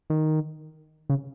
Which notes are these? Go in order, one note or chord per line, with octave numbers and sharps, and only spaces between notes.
D#3
C#3